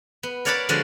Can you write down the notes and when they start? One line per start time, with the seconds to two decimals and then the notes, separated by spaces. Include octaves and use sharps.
0.23 B3
0.45 A#4 C#5 D5 F#5 A5 B5
0.69 D3 F3 G#3 F#4 D5